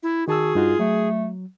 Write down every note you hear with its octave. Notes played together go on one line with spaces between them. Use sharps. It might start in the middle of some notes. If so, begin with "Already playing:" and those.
E4
D#3 F#4 G#4 A5 E6
G2 D#4 F4 F#4
F#3 A3